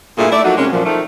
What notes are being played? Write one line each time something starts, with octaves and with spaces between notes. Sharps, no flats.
G2 A#2 A3 E4 G#4
A3 E4 D5
F3 F#3 A3 A#3 D#4 F#4
C3 G#3 A#3 C#4
F#2 A#2 F3
D#3 F3 A3